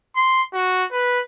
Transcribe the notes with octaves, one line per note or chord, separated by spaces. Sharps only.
C6
F#4
B4